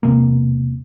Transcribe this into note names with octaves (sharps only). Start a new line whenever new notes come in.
E1 C3 A#3